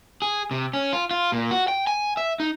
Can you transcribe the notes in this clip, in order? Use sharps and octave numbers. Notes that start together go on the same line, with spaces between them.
G#4
C3
C#4
F4
F4
A#2
F#4
G5
G#5
E5
D#4